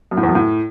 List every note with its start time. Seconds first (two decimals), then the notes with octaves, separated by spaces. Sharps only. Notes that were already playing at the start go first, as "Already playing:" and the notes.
0.11 F#2
0.17 A2
0.23 E2
0.29 F#2
0.35 A2